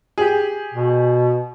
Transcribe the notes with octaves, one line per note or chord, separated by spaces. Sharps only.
G4 G#4
B2